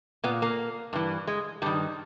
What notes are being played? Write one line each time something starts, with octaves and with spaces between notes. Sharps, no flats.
A#2 B3
A#3
G2 E3
G#3
G2 D#3 G3